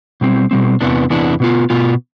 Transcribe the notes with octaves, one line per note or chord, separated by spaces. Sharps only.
B2 G3 C4
B2 G3 C4
E2 C3 E3 B3 D4
E2 C3 E3 B3 D4
B2 B3 F4
B2 B3 F4